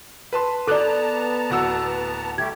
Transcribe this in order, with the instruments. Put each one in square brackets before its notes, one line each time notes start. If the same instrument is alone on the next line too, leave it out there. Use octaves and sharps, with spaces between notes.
[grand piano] B4 A5 C6
[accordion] B3 A5 A#5 [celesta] A4 D5 [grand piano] D6 F#6
[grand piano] D1 F#4 E6
[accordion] G3 A3 G4 [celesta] G#6